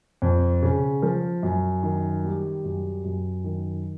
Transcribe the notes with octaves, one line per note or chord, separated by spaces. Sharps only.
F2
C#3
F3
F#2
D#3
G3
F#2
F#2
D#3